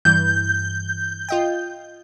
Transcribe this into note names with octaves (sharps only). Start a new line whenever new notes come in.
G2 E3 G6
F4 D#5 G5